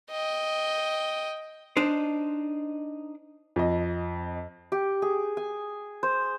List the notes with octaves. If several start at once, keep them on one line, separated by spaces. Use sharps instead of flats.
D#5 G5
D4 D#4 C5
F2 D#5
G4
G#4
G#5
C5